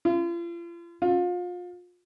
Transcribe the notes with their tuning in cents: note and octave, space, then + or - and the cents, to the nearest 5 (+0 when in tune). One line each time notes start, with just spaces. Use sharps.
F4 -40
F4 +30